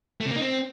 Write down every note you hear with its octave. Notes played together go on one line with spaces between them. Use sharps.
A3
C3
A#3
D#4
C4